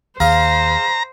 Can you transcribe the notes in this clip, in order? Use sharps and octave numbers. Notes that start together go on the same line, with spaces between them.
D#2 G#4 C5 F5 A#5 C6